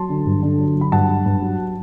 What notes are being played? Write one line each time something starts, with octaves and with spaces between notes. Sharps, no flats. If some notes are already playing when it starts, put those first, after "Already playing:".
Already playing: F#3 A5 C6
D3
G2
D3
F#3
F#3
B5
G2 F#5 A5
G2
G2
F#3